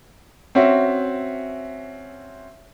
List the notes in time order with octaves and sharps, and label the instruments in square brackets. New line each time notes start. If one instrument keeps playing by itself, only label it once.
[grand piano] C4 C#4 F#4 E5